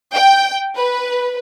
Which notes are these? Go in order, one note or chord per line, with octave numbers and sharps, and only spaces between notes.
G5
B4